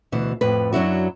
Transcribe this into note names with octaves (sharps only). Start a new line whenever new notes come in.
D2 B2 E3
F2 A2 B4
F#2 F#3 D4 E4 F#4